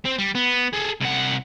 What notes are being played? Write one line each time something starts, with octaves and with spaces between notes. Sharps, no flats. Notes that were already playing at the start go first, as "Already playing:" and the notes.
C4
G3
B3
G#4 A4
C2 F#5